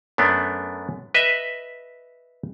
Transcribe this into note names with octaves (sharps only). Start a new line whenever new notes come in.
F#2 A3 B3 D4
B4 D#5 E5